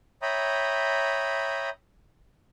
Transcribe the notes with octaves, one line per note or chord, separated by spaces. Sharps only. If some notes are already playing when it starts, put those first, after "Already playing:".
C#5 E5 G5 A#5 B5 D#6